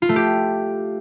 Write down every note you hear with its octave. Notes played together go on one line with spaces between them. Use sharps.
F4
A3
G4